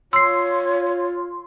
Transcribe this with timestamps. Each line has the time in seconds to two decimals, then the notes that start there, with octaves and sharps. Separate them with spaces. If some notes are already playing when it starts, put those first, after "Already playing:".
0.13 F4 C#5 C6 E6 C7